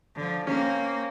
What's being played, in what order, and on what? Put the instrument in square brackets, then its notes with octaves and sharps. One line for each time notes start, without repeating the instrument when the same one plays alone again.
[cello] D3 F3
[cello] A#3 C4 [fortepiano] C#4